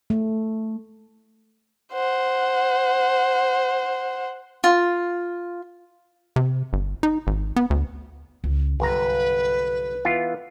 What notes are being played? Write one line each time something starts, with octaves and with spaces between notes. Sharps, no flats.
A3
C5 F#5
F4
C3
G1
D#4
G#1
B3
D2
C#2
G1 C2 F#3 B4 A#5
E3 B3 F4